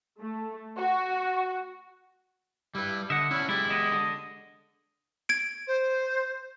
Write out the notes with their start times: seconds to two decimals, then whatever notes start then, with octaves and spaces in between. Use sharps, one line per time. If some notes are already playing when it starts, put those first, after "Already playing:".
0.20 A3
0.78 F#4
2.75 G3 E4 B4
3.10 D3 D#5 E5 F#5
3.31 C#4 D4 E4
3.49 G#3 E4 G4 A4
3.70 B3 E4 D#5
3.92 D3
5.29 G#6 D7
5.67 C5